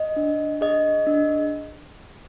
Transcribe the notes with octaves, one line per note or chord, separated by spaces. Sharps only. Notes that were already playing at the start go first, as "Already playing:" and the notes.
Already playing: D#5
D4
G#4 D#5
D4